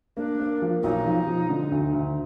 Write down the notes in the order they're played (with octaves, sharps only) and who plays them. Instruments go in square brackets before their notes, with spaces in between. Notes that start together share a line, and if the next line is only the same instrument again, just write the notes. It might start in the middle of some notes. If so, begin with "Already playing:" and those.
[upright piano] A#3 [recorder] D4
[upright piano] A#3
F3
[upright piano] B1 [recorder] D#4
[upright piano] F3
F3
D3
D2
D2